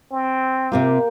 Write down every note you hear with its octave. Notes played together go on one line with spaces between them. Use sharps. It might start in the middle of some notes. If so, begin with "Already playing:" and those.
C4
C3 A#3 C4 F4 G4